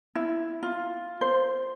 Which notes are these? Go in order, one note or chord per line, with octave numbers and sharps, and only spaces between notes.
E4
F4
C5